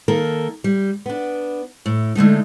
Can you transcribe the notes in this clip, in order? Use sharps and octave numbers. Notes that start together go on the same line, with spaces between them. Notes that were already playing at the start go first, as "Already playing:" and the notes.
D#3 A#3 A4 A#4
G3
B3 D4
A2
D3 G#3 A3 D#4